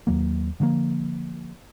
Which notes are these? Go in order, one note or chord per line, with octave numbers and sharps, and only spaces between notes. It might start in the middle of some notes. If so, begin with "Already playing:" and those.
D#2 F#3 A#3
D3 F3 G#3 A#3